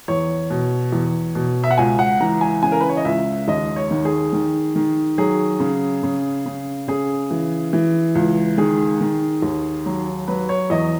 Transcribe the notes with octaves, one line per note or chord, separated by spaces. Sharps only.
E2 C#5
B2
E2
B2
E5
F#5
C#2 G#5
F#5
E3 A#5
G#5
C#3 G#5
A#4
B4
C#5
D#5
C#2 E5
D#2 D#5
C#5
D#3
G#4
D#3
D#3
F#3 G#4
C#3
C#3
C#3
C#3 G#4
E3
E3
C#2
D#3 G#4
D#3
D#2
F#3
F#3 B4
C#5
E2 D#5